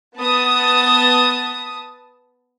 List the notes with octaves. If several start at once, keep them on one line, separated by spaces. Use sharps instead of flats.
B3 A5 D#6